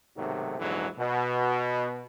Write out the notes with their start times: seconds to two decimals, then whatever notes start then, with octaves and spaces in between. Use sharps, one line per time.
0.16 B1 G#2 C3 D#3 F#3 A3
0.59 A#1 E2 G#2 D3 E3 F#3
0.98 B2